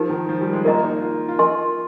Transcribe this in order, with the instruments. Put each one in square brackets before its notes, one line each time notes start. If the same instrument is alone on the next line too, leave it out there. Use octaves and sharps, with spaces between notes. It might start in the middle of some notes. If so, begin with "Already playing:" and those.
Already playing: [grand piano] F3 [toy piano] D#4 G4 A#4
[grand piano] D#3
F3
G3
G#3
[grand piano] A#3 [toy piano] A#4 D#5 A#5
[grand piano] D#4
F4
F4
[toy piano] A#4 D#5 G#5 C6